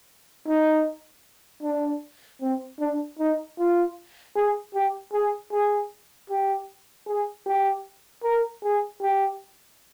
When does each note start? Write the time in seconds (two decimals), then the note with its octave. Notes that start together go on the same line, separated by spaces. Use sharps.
0.47 D#4
1.63 D4
2.41 C4
2.80 D4
3.19 D#4
3.58 F4
4.36 G#4
4.75 G4
5.13 G#4
5.53 G#4
6.30 G4
7.07 G#4
7.46 G4
8.24 A#4
8.63 G#4
9.02 G4